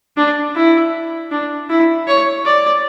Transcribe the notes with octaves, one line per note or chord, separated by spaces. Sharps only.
D4
E4
D4
E4
C#5
D5